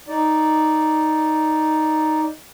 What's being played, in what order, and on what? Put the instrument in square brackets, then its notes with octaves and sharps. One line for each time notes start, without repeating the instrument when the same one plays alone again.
[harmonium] D#4 D5